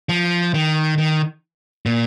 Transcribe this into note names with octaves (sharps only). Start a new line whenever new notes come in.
F3
D#3
D#3
A#2